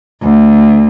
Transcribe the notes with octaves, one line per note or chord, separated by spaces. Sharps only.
D2